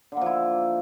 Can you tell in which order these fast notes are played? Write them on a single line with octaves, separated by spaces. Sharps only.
D3 A#3 F3 E4